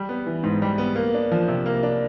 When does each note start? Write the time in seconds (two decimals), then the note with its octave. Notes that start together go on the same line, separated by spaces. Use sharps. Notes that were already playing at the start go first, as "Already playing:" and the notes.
Already playing: G3
0.09 B3
0.26 E3
0.43 G#2
0.62 G3
0.78 B3
0.96 A#3
1.14 D4
1.32 F3
1.48 C3
1.66 A#3
1.83 D4